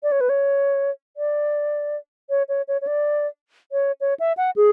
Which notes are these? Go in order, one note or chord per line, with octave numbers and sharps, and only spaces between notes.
D5
C#5
B4
C#5
D5
C#5
C#5
C#5
C#5
D5
C#5
C#5
E5
F#5
G#4